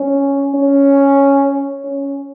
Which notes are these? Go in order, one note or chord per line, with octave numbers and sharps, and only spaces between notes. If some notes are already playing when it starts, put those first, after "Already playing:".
Already playing: C#4
C#4
C#4